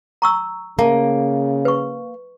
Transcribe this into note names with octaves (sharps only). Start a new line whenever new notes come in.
A#5 C#6 E6
C#3 A#3 A5
B4 C#6